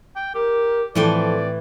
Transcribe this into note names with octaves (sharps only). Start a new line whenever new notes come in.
G5
G4 A#4
A2 E3 F3 C4 A4 D5 G5